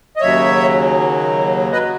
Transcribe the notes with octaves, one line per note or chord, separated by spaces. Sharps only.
D#5
D#2 C#3 F#3 C#5 E5
F#3 B4 D#5